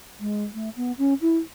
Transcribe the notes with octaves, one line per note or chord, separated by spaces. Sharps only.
G#3
A3
B3
C#4
E4